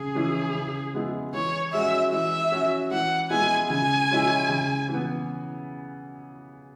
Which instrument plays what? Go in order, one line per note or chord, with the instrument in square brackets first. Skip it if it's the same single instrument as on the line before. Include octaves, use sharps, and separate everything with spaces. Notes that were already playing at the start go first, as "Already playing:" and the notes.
Already playing: [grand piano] C#3 [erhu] G#4
[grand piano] E3 C#4 E4
C#3
G#3 B3 E4
[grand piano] E3 [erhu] C#5
[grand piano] G#3 C#4 F#4 [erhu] E5
[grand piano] E3 [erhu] E5
[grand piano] C#4 F#4
[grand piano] E3 [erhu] F#5
[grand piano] G#3 B3 E4 [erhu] G#5
[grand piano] C#3 [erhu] G#5
[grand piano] G#3 C#4 E4
C#3
E3
B3